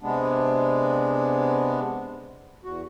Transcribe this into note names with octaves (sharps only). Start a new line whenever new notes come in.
C3 G#3 B3 D4
E2 F#4